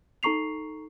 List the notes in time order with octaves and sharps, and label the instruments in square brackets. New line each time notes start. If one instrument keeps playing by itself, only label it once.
[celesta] D#4 A4 A#5 C#6 C7 F7